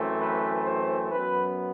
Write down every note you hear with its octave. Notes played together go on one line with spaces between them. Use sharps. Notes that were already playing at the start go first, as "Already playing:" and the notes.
Already playing: F#2 E3 A3 C4
B4
C5
F#2 F#3 B3 B4